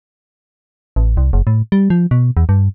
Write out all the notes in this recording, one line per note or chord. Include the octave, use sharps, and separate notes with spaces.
A1
C2
F#1
A2
G3
F3
B2
E2
G2